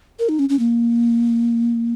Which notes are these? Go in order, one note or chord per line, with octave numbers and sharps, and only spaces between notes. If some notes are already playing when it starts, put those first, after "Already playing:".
A#4
D#4
C#4
C#4
A#3